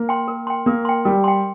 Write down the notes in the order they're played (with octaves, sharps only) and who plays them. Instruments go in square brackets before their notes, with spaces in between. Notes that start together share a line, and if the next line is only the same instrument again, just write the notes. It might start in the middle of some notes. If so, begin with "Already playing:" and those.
Already playing: [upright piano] A#3
[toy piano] G5 C6
A#4
G5 C6
[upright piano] A#3 [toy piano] A#4
[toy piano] G5 C6
[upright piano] G3 [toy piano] A#4
[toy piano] G5 C6